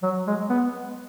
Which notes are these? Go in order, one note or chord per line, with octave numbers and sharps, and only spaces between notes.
F#3
G#3
B3